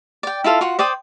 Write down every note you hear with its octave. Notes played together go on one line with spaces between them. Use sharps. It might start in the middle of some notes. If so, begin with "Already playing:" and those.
D5 G5
E4 F4 A4 F5
F4 F#4 F#5
C5 D5 G5 D#6